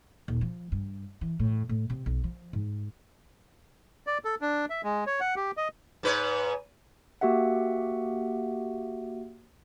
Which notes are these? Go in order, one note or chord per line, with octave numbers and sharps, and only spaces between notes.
D#1
F3
G2
E3
A2
A2
C3
B1
F3
G#2
D5
A4
D4
E5
G#3
C#5
F#5
G4
D#5
G#2 B4 C#5
A#3 F#4 G4 E5 F#5